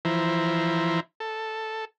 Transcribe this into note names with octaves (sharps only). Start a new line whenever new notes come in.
E3 F3 E4 C5 A#5
A4